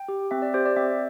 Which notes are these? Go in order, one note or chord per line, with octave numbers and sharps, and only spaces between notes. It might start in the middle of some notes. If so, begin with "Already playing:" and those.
Already playing: G5
G4
C4 E5
D5
G4 C5
D5
C4 E5